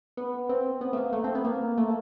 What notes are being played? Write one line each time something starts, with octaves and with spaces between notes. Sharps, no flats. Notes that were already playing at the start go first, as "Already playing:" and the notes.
B3
C4
B3
A3
A#3
A3
C4
B3
A#3
A3